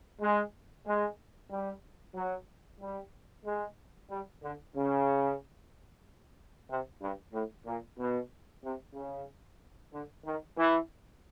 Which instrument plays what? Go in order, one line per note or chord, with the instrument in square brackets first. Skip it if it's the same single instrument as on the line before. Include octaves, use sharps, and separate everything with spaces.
[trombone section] G#3
G#3
G3
F#3
G3
G#3
G3
D3
C#3
C3
G2
A2
A#2
B2
C3
C#3
D3
D#3
E3